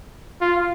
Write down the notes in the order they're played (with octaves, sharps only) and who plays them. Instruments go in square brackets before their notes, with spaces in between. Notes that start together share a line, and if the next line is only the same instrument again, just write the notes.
[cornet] F4